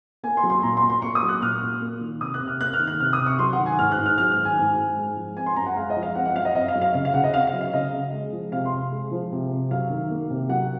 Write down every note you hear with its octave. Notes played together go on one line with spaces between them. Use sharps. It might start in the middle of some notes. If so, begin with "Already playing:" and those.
A#3 G#5
C6
F#3
C6
A#2 A#5
C6
A#2
C6
A#3 C#6
D#6
F#3
F#6
A#2 F6
A#2
A#3
D#3
C3 D#6
F#6
C3
F6
A#3 F#6
F6
D#3
F#6
C3 F6
D#6
C3
C#6
F#3 C6
F#5
D#3
G#5
G#2 F6
F#6
G#2
F6
F#3 F6
F6
D#3
G#5
G#2
G#2
G#3
F3
C4 G#5
C6
F#2 A#5
F#5
G#3 F5
D#5
F3
F5
C4 F#5
F#5
F#2 F5
D#5
C4 D#5
F5
F#3
F5
C#3 F5
F5
C#3 F#5
D#5
C4 F5
F5
F#3
F5
C#3 D#5
C#3
G#3
F3
C3 F5
C6
C3
G#3
F3
C3
C3
F#3 F5
D#3
A#3
C3
F#3 F#5